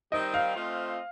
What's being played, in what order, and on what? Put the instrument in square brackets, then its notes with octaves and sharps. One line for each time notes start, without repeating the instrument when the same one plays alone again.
[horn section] D#3 G3 C4 D#4 G4 [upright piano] D#5
[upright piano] F5
[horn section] A3 C4 F4 C5 D#5